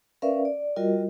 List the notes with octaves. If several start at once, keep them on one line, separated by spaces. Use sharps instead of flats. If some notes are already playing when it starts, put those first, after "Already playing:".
C#4 A#4 B4 D5 E5 F5
D5
G3 F4 F#4 A#4 D#5